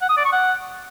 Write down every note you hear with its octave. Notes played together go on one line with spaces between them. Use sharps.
F#5
D#6
D5
C#6
F#5